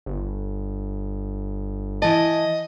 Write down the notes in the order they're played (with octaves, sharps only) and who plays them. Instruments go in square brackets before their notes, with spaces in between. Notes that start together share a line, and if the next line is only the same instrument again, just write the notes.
[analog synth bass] G1
[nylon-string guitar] E3 A5 [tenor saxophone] D#5